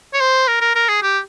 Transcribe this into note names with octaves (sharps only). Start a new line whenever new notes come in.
C#5
C5
A#4
A#4
A#4
G#4
G4